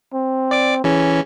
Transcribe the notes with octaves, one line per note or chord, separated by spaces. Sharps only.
C4
D5 D6
E3 C#4 G#4